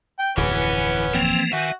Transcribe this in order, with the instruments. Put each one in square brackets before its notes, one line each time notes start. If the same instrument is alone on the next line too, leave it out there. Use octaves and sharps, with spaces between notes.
[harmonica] G5
[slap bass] D1 F2 [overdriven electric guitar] E3 [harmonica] B3 C#4 [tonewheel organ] B4
[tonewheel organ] E3 F3 A#3 [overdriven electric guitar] C4
[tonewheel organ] D#3 [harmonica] F#4 [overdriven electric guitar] E5 G#5